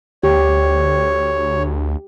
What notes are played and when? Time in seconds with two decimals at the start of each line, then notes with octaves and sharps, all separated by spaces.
0.23 D2 G4 C#5